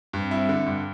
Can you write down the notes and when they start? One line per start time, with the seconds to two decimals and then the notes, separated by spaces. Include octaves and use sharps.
0.13 G2 G3 C4
0.31 E4
0.49 D3
0.66 G2